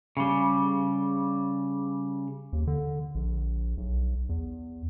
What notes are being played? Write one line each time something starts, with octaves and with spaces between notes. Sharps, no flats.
C#3 G3
D#2
D3
A#1
B1
E2